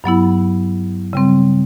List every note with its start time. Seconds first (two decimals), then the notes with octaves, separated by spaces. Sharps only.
0.04 G2 F#3 B3 E4
1.13 C#3 G3 C4